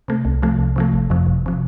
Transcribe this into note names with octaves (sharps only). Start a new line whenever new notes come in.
C3 A3
C2
C3 F3 A3
C2
C3 F3 A3
G1
F2 C3 F3
G1
C3 F3